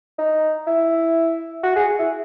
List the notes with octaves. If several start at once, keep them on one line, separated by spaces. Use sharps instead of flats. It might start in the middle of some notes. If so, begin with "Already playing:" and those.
D#4
E4
F#4
G#4
E4